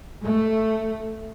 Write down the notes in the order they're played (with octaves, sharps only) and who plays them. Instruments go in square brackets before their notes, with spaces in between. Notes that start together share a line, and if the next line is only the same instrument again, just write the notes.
[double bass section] A3